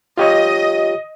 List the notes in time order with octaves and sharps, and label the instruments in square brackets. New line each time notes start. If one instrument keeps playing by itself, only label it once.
[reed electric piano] F4 G4 C#5 [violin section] D#5